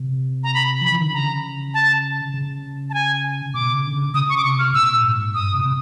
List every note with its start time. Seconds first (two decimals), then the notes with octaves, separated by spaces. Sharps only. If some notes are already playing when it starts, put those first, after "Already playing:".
Already playing: C3
0.44 A#5
0.54 B5
0.81 F3 B5
0.90 E3
0.98 D#3
1.05 D3
1.13 C#3 A#5
1.74 A5
2.34 C#3
2.90 A5
2.94 G#5
3.54 B2 D6
3.75 C#3
3.87 D3
3.94 C#3
4.14 C#3 D#6
4.29 C#6
4.37 D6
4.44 C3 C#6
4.59 F6
4.74 A#2 E6
5.04 G#2
5.34 G2 D#6
5.54 C3
5.66 C3